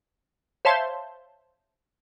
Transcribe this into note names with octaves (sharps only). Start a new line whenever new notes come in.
C5 C#5 E5 F5 A5 C6